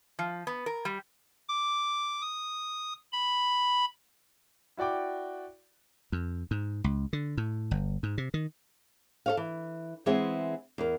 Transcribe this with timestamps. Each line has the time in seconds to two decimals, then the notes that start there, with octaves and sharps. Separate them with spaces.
0.19 F3
0.47 B3
0.66 A#4
0.85 G3
1.48 D6
2.22 D#6
3.13 B5
4.77 E4 F#4 D5 G5 D6
6.12 F2
6.51 G#2
6.84 C#2
7.13 D3
7.37 A2
7.71 G1
8.03 G#2
8.18 C3
8.34 D#3
9.26 A4 C#5 F5
9.37 E3
10.06 E3 G#3 B3 C4 G#4 E5
10.78 E2 A#4